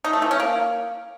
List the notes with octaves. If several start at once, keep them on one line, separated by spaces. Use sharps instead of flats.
D#4
A3
E3
C#4
A#3